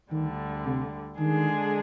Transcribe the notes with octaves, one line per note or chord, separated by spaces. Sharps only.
D2 D3 D#3 G3
C3
D3 D#3 G#3 D4 G#4